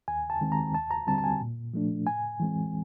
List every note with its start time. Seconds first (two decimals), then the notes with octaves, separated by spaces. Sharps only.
0.08 D#2 G#5
0.30 A5
0.41 D#3 G#3 C4
0.52 A#5
0.74 D#2 A5
0.91 A#5
1.07 D3 G3 C4 A5
1.18 A5
1.24 G#5
1.40 A#2
1.74 F3 A3 D4
2.07 A2 G#5
2.40 E3 G#3 C4